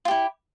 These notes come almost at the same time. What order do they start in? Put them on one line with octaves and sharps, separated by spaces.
F4 G4 E4